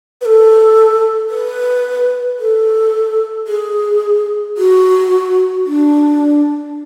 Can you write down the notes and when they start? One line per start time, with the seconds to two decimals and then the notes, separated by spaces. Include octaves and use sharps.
0.21 B4
0.25 A4
1.29 B4
2.39 A4
3.47 G#4
4.57 F#4
5.66 D4